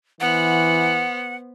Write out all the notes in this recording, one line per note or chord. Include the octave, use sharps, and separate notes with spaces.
E3 B3 C5 F#5